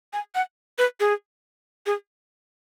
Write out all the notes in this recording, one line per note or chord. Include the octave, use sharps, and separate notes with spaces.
G#5
F#5
B4
G#4
G#4